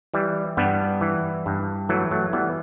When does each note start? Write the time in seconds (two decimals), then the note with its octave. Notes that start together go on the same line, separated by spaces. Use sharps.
0.14 E3 G3
0.57 G2 G3 B3
1.01 E3
1.46 G2
1.89 E3 F#3 A3
2.11 F#3 A3
2.33 E3 G3 B3